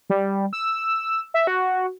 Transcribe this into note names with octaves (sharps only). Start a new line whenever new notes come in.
G3
E6
E5
F#4